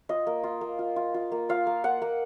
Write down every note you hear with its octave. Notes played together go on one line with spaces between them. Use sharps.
F4 D#5
A#3
F4
A#3
F4
F4
F4
A#3
F4 F5
A#3
A#3 F#5
A#3